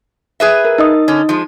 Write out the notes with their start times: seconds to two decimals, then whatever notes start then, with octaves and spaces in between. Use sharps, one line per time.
0.40 G#4 B4 E5
0.65 A#4
0.78 D#4 D#5 D#6
1.08 D3 C#4
1.29 F3 G#3